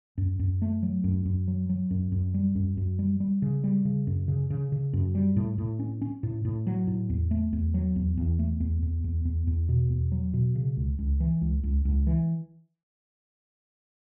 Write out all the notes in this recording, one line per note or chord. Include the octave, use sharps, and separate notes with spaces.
F#2
F#2
A3
F#3
F#2
F#2
F#3
F#3
F#2
F#2
G3
F#2
F#2
G3
G3
C#3
G3
C#3
F#2
C#3
C#3
C#3
F#2
G3
A2
A2
C#4
C#4
A2
A2
F#3
A2
E2
A3
E2
F#3
E2
E2
A3
E2
E2
E2
E2
E2
B2
E2
F#3
B2
C#3
C#2
C#2
E3
C#2
C#2
C#2
E3